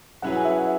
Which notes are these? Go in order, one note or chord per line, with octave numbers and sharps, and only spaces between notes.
F#3 C#4 E4 G#4 B4 F#5
G#5
E5
F#5